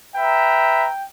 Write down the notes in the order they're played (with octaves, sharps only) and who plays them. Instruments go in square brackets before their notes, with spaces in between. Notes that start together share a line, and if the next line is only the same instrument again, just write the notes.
[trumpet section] B4 E5 A#5 [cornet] G5